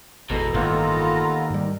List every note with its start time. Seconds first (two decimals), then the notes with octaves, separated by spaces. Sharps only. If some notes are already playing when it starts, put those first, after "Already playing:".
0.30 G#1 E2 B2 A4 A#5
0.54 G1 D#2 A2 E3 B3 F4
1.50 G#2 G3